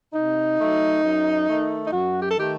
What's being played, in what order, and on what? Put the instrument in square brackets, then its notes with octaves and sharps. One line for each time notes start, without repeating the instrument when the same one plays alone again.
[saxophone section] C3 D#4
F#3 A3
F#2
D#3 A3
D#4
F#2 F#4
G4
A4
D#3 A3 G4